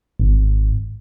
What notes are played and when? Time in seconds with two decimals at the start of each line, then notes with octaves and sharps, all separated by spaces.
0.19 G#1